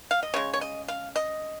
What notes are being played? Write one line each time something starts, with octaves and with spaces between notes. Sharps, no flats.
F5
D#5
C#3 G#3 C#5
C#5
D#5
F5
D#5